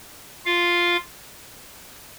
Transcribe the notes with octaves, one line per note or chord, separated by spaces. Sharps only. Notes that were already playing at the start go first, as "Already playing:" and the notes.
F4 F5